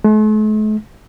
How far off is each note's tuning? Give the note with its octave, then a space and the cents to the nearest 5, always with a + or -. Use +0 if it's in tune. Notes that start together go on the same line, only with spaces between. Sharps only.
A3 -45